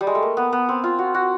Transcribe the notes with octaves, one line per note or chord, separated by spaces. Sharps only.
G3
G#3
A3
A#3
B3
B3
C4
F4
F#4
F#4